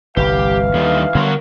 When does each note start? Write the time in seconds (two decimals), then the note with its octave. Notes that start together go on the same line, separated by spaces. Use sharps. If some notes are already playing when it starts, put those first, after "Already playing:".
0.17 G1 C2 E3 G4 F5
0.74 D#2 D3 G3 D#4
1.15 D3 F#3 G3 B3 A#4 C#5